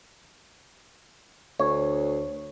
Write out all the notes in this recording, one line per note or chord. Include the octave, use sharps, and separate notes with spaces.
D2 C#5